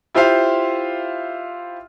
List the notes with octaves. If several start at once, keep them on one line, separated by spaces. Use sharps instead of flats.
E4 F4 G4 C5 E5 F5